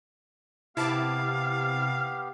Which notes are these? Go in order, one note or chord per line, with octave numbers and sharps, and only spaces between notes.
C3 B3 E4 G4 F5 A5 D6